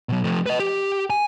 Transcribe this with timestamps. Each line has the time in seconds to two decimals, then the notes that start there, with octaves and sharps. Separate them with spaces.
0.09 B2 F#3
0.24 F3 A3
0.46 B4 D#5
0.60 G4
1.10 G#5